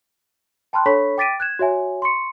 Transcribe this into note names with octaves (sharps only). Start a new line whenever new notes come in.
G5 A5 B5 C6 F6 F#6
D4 A4 C#5 B5 C#6 B6
G5 D6 A6 B6 D7 D#7
F#6 G#6 E7
F#4 C#5 E5 G#5
C6 C#6 C#7